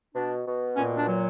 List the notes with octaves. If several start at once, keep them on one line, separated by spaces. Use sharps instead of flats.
B2 D4
B2
A#2 C#4
D4
F#3